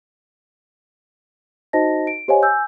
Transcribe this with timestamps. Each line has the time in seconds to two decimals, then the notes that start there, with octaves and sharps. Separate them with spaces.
1.73 D#4 F#4 C5 D#5 A5 A#6
2.07 D7
2.28 G4 C5 C#5 D#5 F5 G#5
2.43 G#5 E6 G6